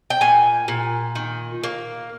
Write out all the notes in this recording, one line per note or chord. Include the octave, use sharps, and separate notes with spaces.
G5
A#2 G#5
A#2
D#3
A#3